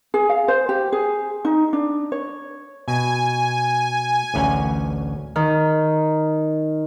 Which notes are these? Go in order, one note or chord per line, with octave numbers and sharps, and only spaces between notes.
G#4
F5
C5
G4
G#4
D#4
D4
C#5
B2 G#5
A1 D2 C#4
D#3